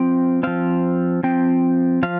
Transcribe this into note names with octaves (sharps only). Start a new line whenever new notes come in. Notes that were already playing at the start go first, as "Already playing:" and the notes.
Already playing: F3 C4 G5
F3 C4 F5
F3 C4 G5
F3 F5